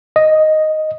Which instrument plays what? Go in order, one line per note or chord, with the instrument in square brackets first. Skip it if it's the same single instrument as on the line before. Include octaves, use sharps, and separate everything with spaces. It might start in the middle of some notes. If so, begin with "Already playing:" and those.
[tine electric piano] D#5